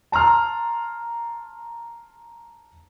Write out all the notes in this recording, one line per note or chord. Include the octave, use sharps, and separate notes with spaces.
A5 A#5 C6 F6